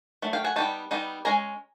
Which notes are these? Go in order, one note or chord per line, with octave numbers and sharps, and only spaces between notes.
F#3 A3
F5 G5
F#5 G#5
G3 B3 D#4 G5 A5
G3 B3 D#4
G#3 C#4 G#5 A#5